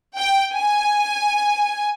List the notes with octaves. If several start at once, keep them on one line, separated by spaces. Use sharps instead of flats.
G5
G#5